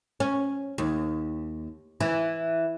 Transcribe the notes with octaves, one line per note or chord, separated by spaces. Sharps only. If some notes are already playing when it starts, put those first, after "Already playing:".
C#4
D#2
E3